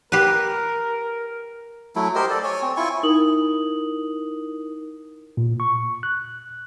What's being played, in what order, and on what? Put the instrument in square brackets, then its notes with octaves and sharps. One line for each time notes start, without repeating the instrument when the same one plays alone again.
[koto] G4 B4 [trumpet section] A#4
[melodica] F#3 A3 E4
G4 A#4 C5 D#5
A4 D5
C#5 G#5
C4
E4 F4 G#5 C#6
[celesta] D#4 E4 A#4 D#6 F#7
[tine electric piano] A#2
C#6
F#6